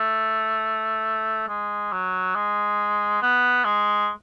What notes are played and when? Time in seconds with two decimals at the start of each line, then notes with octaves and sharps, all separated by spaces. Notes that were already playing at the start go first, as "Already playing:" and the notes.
Already playing: A3
1.48 G#3
1.92 F#3
2.35 G#3
3.22 B3
3.64 G#3